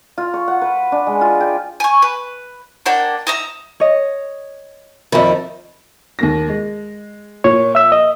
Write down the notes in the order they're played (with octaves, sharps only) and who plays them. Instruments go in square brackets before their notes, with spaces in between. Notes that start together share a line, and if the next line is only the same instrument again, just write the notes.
[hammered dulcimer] F4
C#6
F#5
B4
D4
G#3
F4
G5
[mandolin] G#5 C#6
B4
A#3 D4 F#5 G5
D#4 E5 A#5
[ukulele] C#5 D#5
[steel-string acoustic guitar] F2 D#3 [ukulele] D5 E5 B5
[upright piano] D#2 A#3 A#6
G#3
[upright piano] A#2 [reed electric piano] C#5
[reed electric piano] E5 E6
D#5